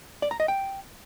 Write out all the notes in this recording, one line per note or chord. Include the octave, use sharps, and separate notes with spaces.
D5
A#5
D#5
G5